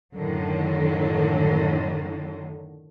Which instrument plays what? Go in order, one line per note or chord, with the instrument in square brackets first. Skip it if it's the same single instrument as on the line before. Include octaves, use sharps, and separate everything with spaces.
[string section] F#2 A2 D3 D#3 F#3